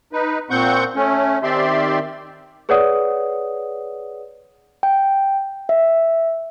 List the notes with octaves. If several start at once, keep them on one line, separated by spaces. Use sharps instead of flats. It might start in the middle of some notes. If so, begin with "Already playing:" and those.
D#4 B4
A#2 C4 F#5 C#6 G6
A3 C#4
D#3 C4 G4 D5 E5 C6
G#4 B4 C#5 D5 F#5 D#6
G5
E5